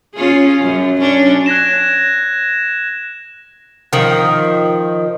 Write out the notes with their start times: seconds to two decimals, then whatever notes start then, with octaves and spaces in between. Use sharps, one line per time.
0.14 C#4 F4 G#4
0.61 F#2
1.00 C#4 D4 C#5
1.46 F#6 G#6 A#6 E7
3.93 D#3 F3